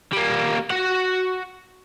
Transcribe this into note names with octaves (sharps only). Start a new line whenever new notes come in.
G3 A#3
F#4 F#5